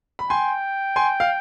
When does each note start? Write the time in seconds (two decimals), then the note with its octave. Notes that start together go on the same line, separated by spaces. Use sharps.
0.19 B5
0.30 G5 G#5 C6
0.96 G#5 C6
1.20 F5